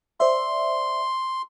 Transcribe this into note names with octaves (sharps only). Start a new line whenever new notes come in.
C5 D5 E5 C6